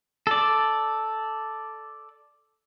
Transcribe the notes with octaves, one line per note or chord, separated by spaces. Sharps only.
A4 D5